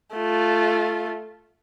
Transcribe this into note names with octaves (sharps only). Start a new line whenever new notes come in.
A3 F4